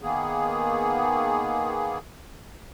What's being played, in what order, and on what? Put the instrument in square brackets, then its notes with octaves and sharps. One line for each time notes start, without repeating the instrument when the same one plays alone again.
[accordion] D#3 A#3 B3 G#4